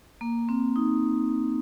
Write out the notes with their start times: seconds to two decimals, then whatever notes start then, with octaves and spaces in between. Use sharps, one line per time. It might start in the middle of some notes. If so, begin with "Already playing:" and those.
0.21 A#3
0.49 C4
0.76 D#4